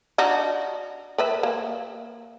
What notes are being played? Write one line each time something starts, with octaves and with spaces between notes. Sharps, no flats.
D4 D#4 F#4
A#4 B4 E5
A#3